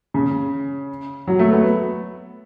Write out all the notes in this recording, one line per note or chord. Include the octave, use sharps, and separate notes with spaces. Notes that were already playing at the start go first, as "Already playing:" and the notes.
C#3
F#3
A3
B3